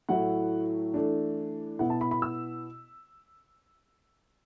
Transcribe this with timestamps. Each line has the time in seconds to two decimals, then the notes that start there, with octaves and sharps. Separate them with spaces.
0.09 A2 F#3 A3 E4 F#5
0.94 E3 A3 D4
1.79 B2 B3 E4 F#5
1.90 A5
2.01 B5
2.11 B5
2.22 E6